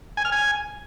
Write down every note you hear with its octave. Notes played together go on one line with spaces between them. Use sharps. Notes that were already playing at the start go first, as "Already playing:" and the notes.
G#5
F6
G#5